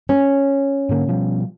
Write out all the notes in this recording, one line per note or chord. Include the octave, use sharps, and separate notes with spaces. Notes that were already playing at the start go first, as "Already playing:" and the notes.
C#4
G#2 D3 A#3
B2 F3 G3